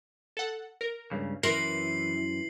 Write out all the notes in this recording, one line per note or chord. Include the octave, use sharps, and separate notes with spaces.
A4 F#5
A#4
C#2 G2 C#3
F#2 E3 A#4 C6 C7 F#7